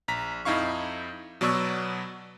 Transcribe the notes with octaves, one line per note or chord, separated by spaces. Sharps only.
A#1 A#5 B6
F2 D#4 E4 F5 C#6
B2 F#3 B3 D5 C#6 E6